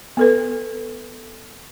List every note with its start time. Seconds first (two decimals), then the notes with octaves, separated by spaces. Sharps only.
0.17 B3 A4 B4